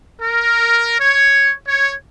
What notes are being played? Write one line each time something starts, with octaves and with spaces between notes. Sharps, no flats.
A#4
C#5
C#5